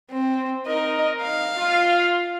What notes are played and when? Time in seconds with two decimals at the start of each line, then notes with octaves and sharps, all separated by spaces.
0.12 C4
0.67 D#4 A#4 D#5
1.22 F5
1.57 F4